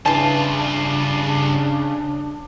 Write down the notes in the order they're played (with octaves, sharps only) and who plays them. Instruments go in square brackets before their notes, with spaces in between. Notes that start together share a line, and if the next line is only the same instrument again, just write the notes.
[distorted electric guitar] G2 F4 [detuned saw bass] C#3 [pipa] E3 A5 [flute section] D4